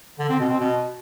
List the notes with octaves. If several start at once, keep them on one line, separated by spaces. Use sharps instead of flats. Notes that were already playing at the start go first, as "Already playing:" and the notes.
D3
C4
B2
C4
B2